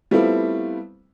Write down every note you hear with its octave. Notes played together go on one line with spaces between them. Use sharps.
G3 A3 B3 C4 E4 F4